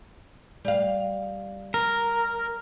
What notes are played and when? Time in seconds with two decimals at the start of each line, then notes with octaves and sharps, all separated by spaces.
0.65 G3 F5
1.74 A#4